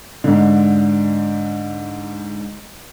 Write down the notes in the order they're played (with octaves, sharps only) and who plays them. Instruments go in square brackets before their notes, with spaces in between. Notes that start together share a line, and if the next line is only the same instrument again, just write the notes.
[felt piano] G#2 D3